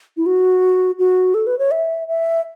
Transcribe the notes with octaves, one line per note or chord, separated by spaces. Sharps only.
E4
F#4
F#4
A4
B4
C#5
E5
E5